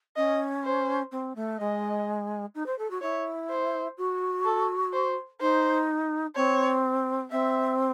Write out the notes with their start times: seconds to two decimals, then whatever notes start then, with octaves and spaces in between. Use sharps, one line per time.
0.16 C#4 D#5
0.64 C5
1.12 C4
1.35 A3
1.59 G#3 D#5
2.55 D#4
2.66 C5
2.78 A4
2.90 F#4
3.02 E4 C#5
3.50 C5
3.98 F#4
4.45 A4
4.93 C5
5.41 D#4 C5
6.35 C4 C#5
7.31 C4 E5